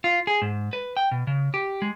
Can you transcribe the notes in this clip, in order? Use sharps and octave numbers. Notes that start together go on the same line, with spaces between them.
F4
G#4
G#2
B4
G5
B2
C#3
G4
G#3